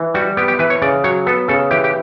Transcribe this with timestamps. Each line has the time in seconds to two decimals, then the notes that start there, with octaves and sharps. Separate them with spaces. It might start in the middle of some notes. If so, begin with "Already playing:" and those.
Already playing: E3
0.14 G3 F#4
0.37 B3 G4
0.48 G4
0.59 E3 B4
0.70 C#5
0.82 C#3 D5
1.04 F#3 C#5
1.26 B3 A4
1.48 C#3 A4
1.71 E3 G4
1.84 G4